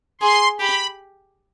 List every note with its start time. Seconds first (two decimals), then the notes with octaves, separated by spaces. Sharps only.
0.21 G#4 C6
0.60 G4 B5